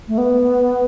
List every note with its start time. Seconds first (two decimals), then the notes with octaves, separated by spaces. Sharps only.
0.08 A3
0.18 B3